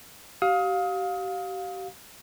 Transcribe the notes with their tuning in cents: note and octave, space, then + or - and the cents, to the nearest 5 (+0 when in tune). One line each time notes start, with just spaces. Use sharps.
G4 -40 F5 +20 D#6 +30